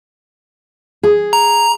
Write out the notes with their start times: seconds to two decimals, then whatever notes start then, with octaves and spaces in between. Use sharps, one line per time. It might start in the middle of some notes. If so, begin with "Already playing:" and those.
1.03 G#4
1.33 A#5